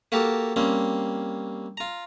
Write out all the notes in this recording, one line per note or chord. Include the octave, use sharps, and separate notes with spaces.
A#3 F#4 G4 A4 A#4
G3 A#3 C4 C#4
F4 A#5